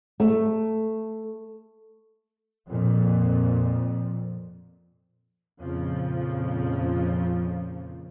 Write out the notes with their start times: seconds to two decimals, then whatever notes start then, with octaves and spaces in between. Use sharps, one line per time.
0.20 A3
2.69 F2 A#2
5.61 F2 A#2 C#3 F3